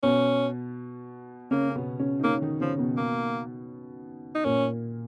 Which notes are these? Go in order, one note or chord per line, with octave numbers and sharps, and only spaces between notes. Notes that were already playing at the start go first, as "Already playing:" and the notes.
B2 B3 C#4
C#3 A#3 C#4
C#4
B2 B3
C#3 C#4
D#4
C#3 A#3 C#4
D#3 D#4
C#3 F3 C#4
B2 B3
A#3
D#4
A#2 A#3 C#4